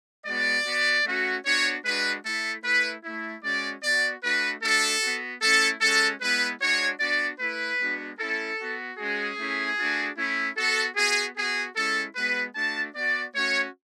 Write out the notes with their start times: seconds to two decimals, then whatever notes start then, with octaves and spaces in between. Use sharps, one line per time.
0.26 G#3 B3 F#4 D5
0.66 B3 F#4
1.06 A3 C#4 F#4
1.45 B3 D4 F#4 C#5
1.85 G#3 D4 F#4 B4
2.25 A3 E4 A4
2.64 A3 E4 B4
3.04 A3 E4
3.43 G#3 C#4 F#4 D5
3.83 B3 F#4 D5
4.23 A3 D4 F#4 B4
4.62 A3 D4 F#4 A4
5.02 B3 F#4
5.42 A3 C#4 E4 A4
5.81 G#3 C#4 F#4 A4
6.21 G#3 B3 E4 B4
6.60 G#3 D4 F#4 C#5
7.00 B3 D4 F#4 D5
7.40 A3 E4 B4
7.79 G#3 B3 D4 F#4
8.19 A3 C#4 E4 A4
8.59 B3 F#4
8.98 G#3 C#4 F#4 G#4
9.38 A3 C#4 E4
9.78 A3 D4 F#4
10.17 A3 C#4 E4
10.57 B3 F#4 A4
10.96 B3 F#4 G#4
11.36 B3 F#4 G#4
11.76 G#3 C#4 E4 A4
12.15 G#3 B3 F#4 B4
12.55 A3 D4 F#4 A5
12.95 B3 F#4 D5
13.34 A3 C#4 F#4 C#5